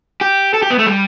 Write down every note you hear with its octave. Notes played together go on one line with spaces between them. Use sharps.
G4
A4
G4
B3
A3
G3